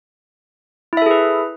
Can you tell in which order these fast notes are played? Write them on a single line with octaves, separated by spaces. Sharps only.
E4 E5 A4 G#4 B4